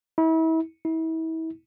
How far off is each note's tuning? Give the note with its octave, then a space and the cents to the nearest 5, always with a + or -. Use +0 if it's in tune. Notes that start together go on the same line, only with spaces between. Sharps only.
E4 -35
E4 -35